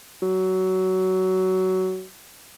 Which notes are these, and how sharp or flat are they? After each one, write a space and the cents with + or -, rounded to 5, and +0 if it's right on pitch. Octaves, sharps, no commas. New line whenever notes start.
F#3 +15